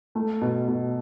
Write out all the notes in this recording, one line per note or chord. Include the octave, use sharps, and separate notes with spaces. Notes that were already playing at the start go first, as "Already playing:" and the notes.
A3
B2
B2